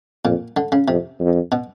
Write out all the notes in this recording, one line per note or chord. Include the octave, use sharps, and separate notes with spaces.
F2 A#2
D3
C#3
F2 C3
F2
B2